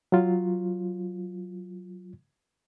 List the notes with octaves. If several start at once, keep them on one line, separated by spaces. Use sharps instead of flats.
F#3 F4